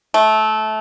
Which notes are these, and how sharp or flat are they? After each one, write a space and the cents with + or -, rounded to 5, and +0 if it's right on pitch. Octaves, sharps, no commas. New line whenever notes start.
A3 -20